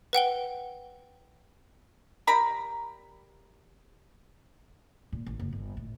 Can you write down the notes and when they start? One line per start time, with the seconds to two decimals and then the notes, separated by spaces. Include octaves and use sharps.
0.13 B4 F#5 G5 G7
2.27 G3 A#4 A#5 B5
5.12 A#2
5.26 A1
5.40 F#1
5.53 G1
5.77 A2